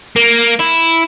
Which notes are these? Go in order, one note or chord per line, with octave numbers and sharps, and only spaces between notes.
A#3
E4